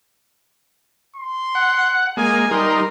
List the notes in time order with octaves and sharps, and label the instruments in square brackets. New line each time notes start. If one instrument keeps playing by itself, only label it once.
[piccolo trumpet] C6
[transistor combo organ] F#5
[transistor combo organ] G#3 A#3 [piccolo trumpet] G#5
[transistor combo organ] G3 D#4 A#4 [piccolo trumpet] C6